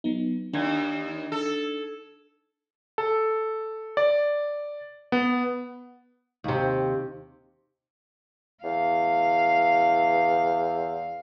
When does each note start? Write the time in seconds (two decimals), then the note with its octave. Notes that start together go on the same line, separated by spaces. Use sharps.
0.04 F#3 B3 D#4
0.53 D#2 D4 G#6
1.32 A4
2.98 A4
3.97 D5
5.12 B3
6.44 D#2 C3
8.64 E2 F5